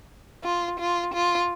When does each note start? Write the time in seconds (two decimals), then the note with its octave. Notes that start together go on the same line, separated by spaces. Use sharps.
0.44 F4
0.79 F4
1.14 F4